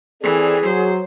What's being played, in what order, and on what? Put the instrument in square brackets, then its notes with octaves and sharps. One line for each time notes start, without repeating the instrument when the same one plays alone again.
[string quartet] E3 [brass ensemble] C4 A4 D5 [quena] G#4
[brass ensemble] F#3 [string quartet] C5